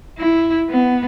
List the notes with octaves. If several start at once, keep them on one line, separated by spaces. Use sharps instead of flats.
E4
B3